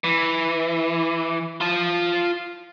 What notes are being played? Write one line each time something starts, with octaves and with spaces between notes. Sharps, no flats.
E3
F4 A5